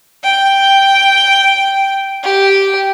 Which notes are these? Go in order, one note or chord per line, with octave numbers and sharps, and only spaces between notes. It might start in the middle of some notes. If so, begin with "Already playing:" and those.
G5
G4